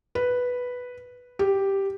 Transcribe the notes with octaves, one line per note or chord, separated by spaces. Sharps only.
B4
G4